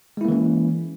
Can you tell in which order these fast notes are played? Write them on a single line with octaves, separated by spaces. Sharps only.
G#3 E4 A#3 E3 C#4